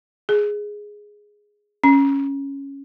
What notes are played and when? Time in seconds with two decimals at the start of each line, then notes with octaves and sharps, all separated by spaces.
0.29 G#4
1.84 C#4